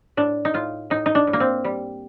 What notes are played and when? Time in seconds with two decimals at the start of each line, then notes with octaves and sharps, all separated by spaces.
0.17 A2 D4
0.45 D#4
0.54 A2 F4
0.90 A2 D#4
1.06 D#4
1.15 D4
1.27 A2
1.33 A#3
1.40 C4
1.64 G3